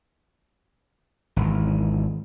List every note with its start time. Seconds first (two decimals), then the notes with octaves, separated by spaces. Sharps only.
1.36 G#1 E2